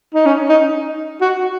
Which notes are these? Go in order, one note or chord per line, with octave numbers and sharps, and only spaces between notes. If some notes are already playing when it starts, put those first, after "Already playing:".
D#4
C#4
D#4
F#4